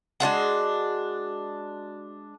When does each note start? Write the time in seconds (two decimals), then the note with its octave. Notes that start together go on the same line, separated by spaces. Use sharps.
0.20 G#3 D4 F4 F#4